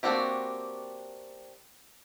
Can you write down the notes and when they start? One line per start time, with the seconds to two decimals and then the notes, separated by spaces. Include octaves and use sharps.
0.03 A#3 C4 D4 F#4 G4